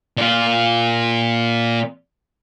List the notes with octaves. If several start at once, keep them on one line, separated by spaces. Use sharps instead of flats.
A#2 F4